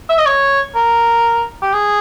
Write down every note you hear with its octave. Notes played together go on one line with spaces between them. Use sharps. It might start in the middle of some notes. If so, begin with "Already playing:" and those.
E5
D#5
C#5
A#4
G4
G#4